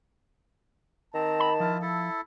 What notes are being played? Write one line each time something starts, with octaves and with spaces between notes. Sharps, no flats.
D#3 C4 A5 A#5
B5
F3 E4 F4
E4 A4